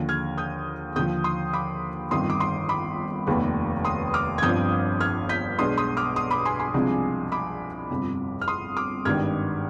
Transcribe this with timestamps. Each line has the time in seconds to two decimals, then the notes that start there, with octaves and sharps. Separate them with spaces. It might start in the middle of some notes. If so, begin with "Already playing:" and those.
Already playing: D#2 D3 F3
0.09 F6 G#6
0.37 D#6 G6
0.96 D#2 D3 F3 D#6 G6
1.24 C6 D#6
1.53 B5 D6
2.11 G1 F2 D#3 C6 D#6
2.30 D6
2.40 C6 D#6
2.69 B5 D6
3.27 F1 D#2 D#3 B3
3.84 C6 D#6
4.14 D6 F6
4.38 G#6
4.42 G1 G2 F3 C4 D#6 G6
5.00 F6 G#6
5.29 G6 B6
5.59 B1 B2 G#3 B3 D4 C6 D#6
5.78 C6 D#6
5.97 D6 F6
6.16 C6 D#6
6.30 B5 D6
6.45 G#5 C6
6.59 G#5 C6
6.74 C2 C3 F3 G#3 D4
7.32 B5 D6
7.90 G1 F2 C3
8.41 F6
8.48 C6 D#6
8.77 D6 F6
9.05 G#1 G2 D#3 G3 F6 G#6